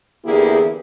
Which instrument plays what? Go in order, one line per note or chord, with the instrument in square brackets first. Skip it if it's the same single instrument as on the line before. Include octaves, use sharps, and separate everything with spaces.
[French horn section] E2 D3 A#3 E4 G4 G#4